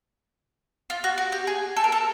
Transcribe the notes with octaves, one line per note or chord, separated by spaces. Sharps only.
F4
F#4
F#4
G4
G#4
A4
A#4
A4